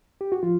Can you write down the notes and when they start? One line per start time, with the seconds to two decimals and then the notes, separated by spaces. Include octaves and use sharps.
0.21 G4
0.32 F#4
0.43 F3 F4